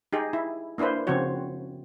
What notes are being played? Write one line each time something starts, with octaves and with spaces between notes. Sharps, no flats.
D#4 G4 G#4
E4
A#3 D4 E4 B4 C5
C#3 F3 C4 F#4 C#5